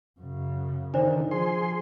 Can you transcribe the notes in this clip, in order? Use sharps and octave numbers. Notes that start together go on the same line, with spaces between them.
F#2 C#3
D3 D#3 D4 C5 D5
F3 G#4 C6